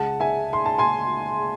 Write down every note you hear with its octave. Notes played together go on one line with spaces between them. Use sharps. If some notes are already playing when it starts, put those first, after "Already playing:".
Already playing: C#2 C#3 G#3 F#5 A5
E5 G#5
C6
A5
G#5 C6